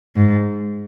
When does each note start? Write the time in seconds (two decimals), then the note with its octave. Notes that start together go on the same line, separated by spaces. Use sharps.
0.16 G#2